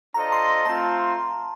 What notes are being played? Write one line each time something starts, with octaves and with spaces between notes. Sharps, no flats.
D4 F4 A4 C5 D#5 A#5
C6
A3 C4 F4 A5